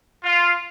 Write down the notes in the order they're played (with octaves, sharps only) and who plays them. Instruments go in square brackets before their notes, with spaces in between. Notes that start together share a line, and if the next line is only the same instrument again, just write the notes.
[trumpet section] F4